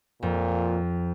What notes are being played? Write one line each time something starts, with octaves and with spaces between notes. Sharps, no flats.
F2 A#2